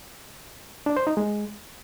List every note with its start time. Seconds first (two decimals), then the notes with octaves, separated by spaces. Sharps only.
0.86 D4
0.97 C5
1.07 D#4
1.17 G#3